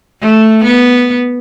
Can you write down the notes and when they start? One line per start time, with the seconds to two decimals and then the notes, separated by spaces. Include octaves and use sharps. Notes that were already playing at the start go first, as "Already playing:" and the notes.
0.21 A3
0.64 B3